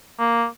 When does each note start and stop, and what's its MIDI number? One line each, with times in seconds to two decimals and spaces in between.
0.19 0.45 58